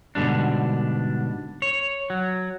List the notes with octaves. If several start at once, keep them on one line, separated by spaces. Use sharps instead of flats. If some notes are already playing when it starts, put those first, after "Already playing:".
G#2 B2 D3 G3 D4
C#5
F#3